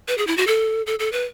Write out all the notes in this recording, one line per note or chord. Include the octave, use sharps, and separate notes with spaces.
B4
G#4
E4
F#4
A4
A4
A4
B4